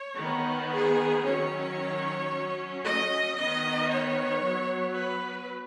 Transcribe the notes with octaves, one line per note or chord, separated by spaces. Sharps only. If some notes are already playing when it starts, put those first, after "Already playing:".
Already playing: C#5
D#3 B3
G#4
D#3 F#3 C#4 C#5
F#3 C#4
D#5
D#3 B3 D#5
C#5
F#3 B3
B4